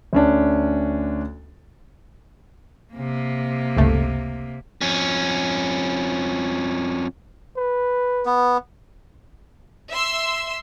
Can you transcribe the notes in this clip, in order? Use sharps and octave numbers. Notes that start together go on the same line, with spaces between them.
D2 C#4 D4
C3 A#3
G1 C#2 A3
F2 C#4
B4
B3
E5 C6 E6